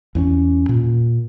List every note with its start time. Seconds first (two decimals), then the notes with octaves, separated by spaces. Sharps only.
0.15 E2 C4 C#4
0.69 A#2